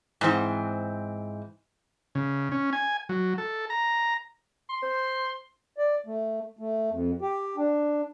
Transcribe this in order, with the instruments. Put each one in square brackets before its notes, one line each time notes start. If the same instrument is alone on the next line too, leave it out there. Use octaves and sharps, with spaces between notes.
[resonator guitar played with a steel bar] G#2 E3 C4
[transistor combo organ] C#3
C#4
G#5
F#3
A4
A#5
[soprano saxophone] C6
[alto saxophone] C5
[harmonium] D5
A3
A3
F2
G4
D4